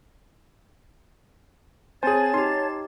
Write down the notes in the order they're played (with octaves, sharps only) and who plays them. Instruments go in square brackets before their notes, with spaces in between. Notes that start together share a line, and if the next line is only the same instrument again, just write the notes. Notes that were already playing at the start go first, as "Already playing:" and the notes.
[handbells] C4 G#5 [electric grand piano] G#4 C5 [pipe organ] C#5 A5 [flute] A6
[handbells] D#4 G4 [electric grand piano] C6